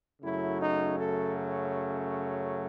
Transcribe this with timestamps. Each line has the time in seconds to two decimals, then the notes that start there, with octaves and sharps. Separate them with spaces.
0.22 F#2 C#3 F#3 A3 E4
0.60 D#4
0.98 A4